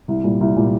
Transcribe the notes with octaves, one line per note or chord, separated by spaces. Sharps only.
C2
A#2 G3
C2
A#2 G3